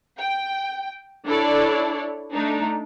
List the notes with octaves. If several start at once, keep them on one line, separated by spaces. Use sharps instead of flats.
G5
D4 E4 A4 C#5 D5
A3 D4 D#4